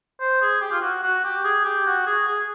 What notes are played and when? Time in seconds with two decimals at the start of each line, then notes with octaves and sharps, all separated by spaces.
0.21 C5
0.42 G#4
0.61 G4
0.72 F4
0.82 F#4
1.03 F#4
1.24 G4
1.44 G#4
1.64 G4
1.86 F#4
2.06 G#4
2.28 G#4